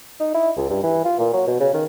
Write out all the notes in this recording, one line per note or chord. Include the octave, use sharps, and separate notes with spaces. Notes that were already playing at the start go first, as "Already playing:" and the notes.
D#4
E4
C#2
G2
E3
F4
A#2
F#3
B2
C#3
D#3